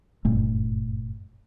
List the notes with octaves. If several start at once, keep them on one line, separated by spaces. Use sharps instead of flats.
F#1 G2 A#2 A3